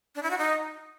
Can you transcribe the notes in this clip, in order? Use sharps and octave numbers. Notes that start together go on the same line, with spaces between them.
D4
E4
F#4
D#4